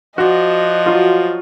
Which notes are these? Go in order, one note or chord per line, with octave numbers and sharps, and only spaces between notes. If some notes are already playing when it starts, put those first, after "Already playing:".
F3 F#4 C5 D5 D#5
F#3 F4 C#5